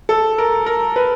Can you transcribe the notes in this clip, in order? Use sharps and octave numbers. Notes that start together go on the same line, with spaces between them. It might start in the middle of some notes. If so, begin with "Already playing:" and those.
A4
A#4
A#4
B4